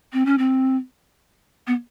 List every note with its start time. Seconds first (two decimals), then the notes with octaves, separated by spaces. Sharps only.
0.13 C4
0.26 C#4
0.38 C4
1.67 B3